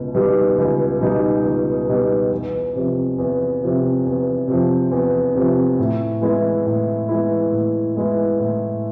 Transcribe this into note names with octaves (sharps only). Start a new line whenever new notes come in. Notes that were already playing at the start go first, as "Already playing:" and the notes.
Already playing: C#2 B2 B3
B2 G3 B3 D#4
C#2
B2 G3 B3 D#4
C#2
B2 G3 B3 D#4
E2
C3 F3
E2
C3 F3
E2
C3 F3
E2
C3 F3
A2
E3 G#3 B3 E4
A2
E3 G#3 B3 E4
A2
E3 G#3 B3 E4
A2